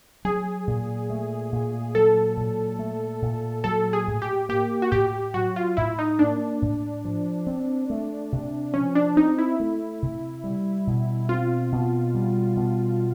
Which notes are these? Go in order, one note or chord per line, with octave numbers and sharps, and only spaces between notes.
F#3 G#4
A#2
A3
A#2
F#3 A4
A#2
A3
A#2
F#3 A4
G#4
A2
G4
A#3 G4
F#4
A2 G4
F#3 F#4
F4
A2 E4
D#4
A#3 D4
A2
F3
C4
A3
C3
F3 C#4
D4
C4 D#4
E4
A3
C3
G3
B2
C4 F4
B2
G3
B2